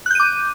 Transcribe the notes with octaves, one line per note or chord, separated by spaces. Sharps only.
D6 F#6 G6 D#7